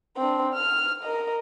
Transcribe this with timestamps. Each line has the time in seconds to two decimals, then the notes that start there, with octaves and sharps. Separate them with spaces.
0.17 C4 D4
0.53 F6
1.03 A#4 D#5